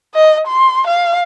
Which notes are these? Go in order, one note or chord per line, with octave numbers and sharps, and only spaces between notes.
D#5
C6
F5